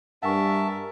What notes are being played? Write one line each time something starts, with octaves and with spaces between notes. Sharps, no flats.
G2 A#4 E5 F#5 G#5 A5 C#6